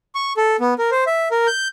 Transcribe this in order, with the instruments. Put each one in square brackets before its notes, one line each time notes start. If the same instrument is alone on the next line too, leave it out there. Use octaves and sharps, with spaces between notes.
[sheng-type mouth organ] C#6
A4
B3
A#4
C5
E5
A#4
G6